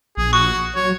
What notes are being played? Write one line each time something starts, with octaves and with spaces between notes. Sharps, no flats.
A#1 G#4
F#4 C#6
F#3 C#5